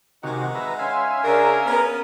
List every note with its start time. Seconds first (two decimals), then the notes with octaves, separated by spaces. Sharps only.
0.24 C3 D#3 G#3 D#4 F#4 F#5
0.55 B4 E5 A#5
0.79 C#4 C#5 E5 F5 G#5 C6
1.24 C#3 D4 A#4 A#5 F6
1.66 B3 C#4